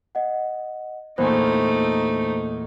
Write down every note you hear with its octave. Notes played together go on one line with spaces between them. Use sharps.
D#5 F#5
E2 A#2 A3 D#4 C5 C#6